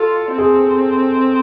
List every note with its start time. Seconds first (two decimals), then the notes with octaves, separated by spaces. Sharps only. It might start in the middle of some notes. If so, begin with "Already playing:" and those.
Already playing: F4 A4
0.38 C4 G#4